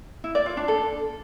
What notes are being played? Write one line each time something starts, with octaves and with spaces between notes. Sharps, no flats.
E4
D5
F4
D4
A4